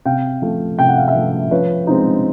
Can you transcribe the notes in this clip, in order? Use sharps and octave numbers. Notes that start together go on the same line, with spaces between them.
C3 F5 G5
F3 A3
C3 G5
F#5
F5
E5 F#5
F3 A3
F3 B4 C#5
G#3 C4 D#4